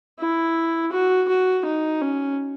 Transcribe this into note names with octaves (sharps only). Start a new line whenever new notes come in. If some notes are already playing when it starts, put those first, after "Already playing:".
E4
F#4
F#4
D#4
C#4